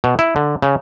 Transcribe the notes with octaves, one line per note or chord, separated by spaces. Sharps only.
B2
E4
D3
C#3